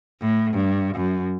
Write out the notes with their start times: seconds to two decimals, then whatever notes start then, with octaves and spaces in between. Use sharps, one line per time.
0.21 A2
0.54 G2
0.96 F#2